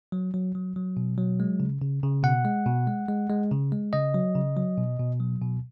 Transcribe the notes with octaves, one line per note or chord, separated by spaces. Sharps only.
F#3
F#3
F#3
F#3
B2
F#3
G#3
C#3
C#3
C#3
B2 F#5
G#3
B2
G#3
G#3
G#3
C#3
G#3
C#3 D#5
F#3
C#3
F#3
B2
B2
F#3
B2